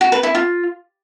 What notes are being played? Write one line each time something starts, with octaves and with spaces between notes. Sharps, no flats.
F#4
B4
E4
F4